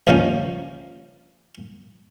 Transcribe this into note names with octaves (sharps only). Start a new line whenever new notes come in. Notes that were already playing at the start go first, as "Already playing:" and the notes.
C#2 G2 D#3 F3 A#3 C#4